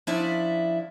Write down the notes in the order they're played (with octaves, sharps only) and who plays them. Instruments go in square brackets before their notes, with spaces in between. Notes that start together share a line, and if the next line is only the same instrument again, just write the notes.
[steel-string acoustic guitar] F3 C#4 D4 E4 D5 E5